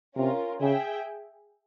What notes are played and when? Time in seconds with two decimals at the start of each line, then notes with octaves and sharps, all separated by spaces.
0.16 C3 C#4 F4 A#4
0.61 C#3 G#4 E5 G5